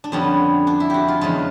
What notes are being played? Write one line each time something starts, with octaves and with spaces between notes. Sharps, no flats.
D4
F2 D3 G3 B3 C#4
D4
E4
F#4 G4
F4
E2 C#3 F3 G#3 F4